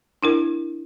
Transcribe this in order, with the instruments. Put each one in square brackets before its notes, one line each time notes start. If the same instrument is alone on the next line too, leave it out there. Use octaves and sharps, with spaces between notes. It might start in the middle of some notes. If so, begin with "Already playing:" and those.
[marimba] D4 E4 A#4